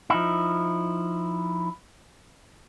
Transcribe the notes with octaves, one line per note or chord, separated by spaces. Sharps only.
F3 D#4 E4